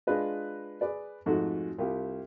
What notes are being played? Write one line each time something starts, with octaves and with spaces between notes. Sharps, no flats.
G#3 D4 F4 B4 D#5
G#4 B4 D5
F2 G#2 A3 F#4
C2 F4 G4